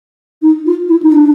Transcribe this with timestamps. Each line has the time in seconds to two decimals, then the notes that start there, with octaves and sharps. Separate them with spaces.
0.42 D#4
0.66 F4
0.88 E4
1.03 D#4
1.12 D4